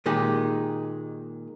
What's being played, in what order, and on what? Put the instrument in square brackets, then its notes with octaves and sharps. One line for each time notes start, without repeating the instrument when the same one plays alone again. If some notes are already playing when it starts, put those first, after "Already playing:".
[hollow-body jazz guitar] A#2 D#3 G#3 G4